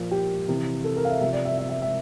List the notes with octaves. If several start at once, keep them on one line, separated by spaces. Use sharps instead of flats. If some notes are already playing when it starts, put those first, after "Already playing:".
Already playing: A#2 F3
G4
C3 E3
A4
A#4
F5
E5
C3 F3 E5
D5
E5
E5
E5
E5